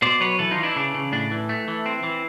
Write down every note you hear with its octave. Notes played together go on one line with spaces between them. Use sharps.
B2 C5 D5
F#3 B4 C#5
E3 A4 B4
D#4 F4
E3
D4 E4
C#3 D4
C#3
A2 D4
E3
A3
E3
C4
E3